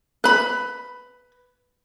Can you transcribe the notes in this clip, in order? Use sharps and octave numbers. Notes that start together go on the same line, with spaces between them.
B4 B5